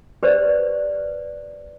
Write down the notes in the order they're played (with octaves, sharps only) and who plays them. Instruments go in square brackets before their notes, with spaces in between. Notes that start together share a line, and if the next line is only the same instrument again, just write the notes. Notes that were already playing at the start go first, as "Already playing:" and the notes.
[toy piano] G4 B4 C5 D5